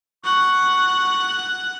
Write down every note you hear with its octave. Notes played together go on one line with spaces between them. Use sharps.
F#5 C#6